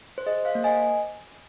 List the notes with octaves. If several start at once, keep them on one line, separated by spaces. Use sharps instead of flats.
C5
G#4 D#5
C5 F5
A#3
D#5 G#5